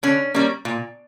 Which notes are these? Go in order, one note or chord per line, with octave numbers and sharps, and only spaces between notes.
D3 C#4
G3 A#3 C#4
A#2